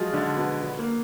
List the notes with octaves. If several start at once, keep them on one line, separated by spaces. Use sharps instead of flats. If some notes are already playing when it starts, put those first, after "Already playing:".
Already playing: F3 F#3 G#3 F4 F#4 G#4
D3 D4
B2 B3
B2 B3
A#3